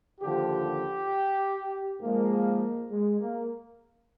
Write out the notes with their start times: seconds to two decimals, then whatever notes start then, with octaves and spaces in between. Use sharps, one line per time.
0.21 D#2 D3 F3 G4
2.00 G#2 F3 G#3 A#3
2.91 G#3
3.20 A#3